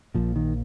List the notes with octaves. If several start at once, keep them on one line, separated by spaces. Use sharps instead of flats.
A#1 A#2 F3
D#3